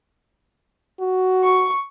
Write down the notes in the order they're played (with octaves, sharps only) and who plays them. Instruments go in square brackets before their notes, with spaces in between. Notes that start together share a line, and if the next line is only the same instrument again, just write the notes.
[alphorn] F#4
[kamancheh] C#6